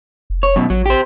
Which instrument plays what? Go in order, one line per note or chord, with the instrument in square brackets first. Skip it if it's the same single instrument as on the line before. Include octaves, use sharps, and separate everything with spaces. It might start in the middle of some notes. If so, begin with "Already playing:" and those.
[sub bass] F1
[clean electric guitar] C#5
F#2 B2
[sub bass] A1 [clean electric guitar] F#3
[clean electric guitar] G4 C5